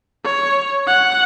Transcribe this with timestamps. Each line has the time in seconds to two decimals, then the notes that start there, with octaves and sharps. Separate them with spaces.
0.24 C#5
0.87 F#5